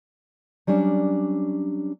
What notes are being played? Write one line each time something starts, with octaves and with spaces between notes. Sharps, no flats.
F#3 G3 C#4 D4